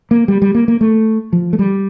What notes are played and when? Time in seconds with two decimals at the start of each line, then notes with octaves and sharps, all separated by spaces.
0.11 A#3
0.28 G3
0.42 G3
0.55 A#3
0.68 A#3
0.81 A3
1.33 F3
1.53 A3
1.59 G3